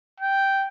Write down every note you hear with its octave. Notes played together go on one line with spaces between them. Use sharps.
G5